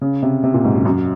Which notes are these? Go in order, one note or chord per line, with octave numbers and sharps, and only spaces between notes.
C#3
C3
C3
A#2
G#2
F#2
F#2